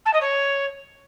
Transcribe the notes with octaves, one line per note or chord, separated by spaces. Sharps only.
A5
D#5
C#5